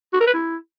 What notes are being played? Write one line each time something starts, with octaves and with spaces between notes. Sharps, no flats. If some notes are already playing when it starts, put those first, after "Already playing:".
F#4
A#4
B4
E4